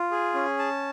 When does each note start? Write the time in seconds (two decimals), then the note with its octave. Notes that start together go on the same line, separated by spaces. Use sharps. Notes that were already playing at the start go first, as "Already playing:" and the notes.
Already playing: F4
0.11 G#4
0.34 C#4
0.59 A5